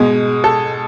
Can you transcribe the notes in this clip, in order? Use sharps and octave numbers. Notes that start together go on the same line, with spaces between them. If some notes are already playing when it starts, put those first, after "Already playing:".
Already playing: B2 G#3
A4